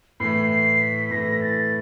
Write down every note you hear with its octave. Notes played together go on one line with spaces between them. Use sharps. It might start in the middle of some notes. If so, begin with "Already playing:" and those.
A2 E3 A3 C7
C7
B6
A2 E3 A3 A#6
A6